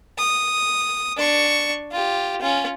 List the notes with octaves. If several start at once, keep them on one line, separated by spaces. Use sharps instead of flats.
D#6
D4 C#6
F4 G4
C#4 F4